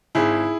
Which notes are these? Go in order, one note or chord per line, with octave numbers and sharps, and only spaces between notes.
G#1 E4 G#4